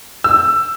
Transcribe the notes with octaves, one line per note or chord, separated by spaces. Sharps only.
E6